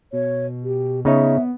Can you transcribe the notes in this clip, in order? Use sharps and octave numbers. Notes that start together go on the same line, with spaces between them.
B2 C#5
G4
C#3 B3 D#4 C#5 E5